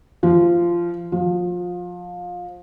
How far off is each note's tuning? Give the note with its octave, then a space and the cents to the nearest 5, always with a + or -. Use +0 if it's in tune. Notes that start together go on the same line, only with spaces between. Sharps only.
F3 -15
F3 +25